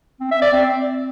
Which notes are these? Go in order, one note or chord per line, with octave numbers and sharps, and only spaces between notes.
C4
E5
D5
C4